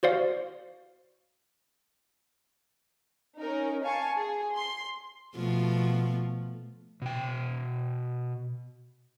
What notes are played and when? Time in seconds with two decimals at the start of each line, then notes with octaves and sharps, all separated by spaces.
0.03 F#4 C5 D5 F5
3.38 C#4 D#4 A#4
3.84 F5 G#5 A5 C#6
4.15 G#4
4.54 C6
5.35 B2 F3 A3
7.02 B2 G5